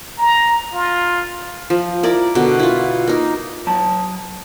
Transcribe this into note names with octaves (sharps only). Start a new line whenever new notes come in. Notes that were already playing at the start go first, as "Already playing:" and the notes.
A#5
F4
F3
E4 A#4 D5
B2 D3
E4 F4
A#3 D#4
F#3 A5